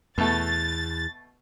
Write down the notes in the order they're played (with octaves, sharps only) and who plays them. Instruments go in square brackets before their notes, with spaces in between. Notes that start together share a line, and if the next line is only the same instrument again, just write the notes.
[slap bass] E2 [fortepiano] B2 A3 [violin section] A6